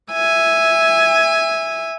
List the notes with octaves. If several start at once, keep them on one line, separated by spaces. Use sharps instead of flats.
E5 G#5